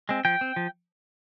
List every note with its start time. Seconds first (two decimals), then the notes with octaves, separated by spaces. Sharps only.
0.09 G#3 C4
0.25 F3 G5
0.41 C4
0.56 F3